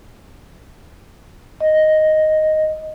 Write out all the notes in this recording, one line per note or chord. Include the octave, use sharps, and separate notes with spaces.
D#5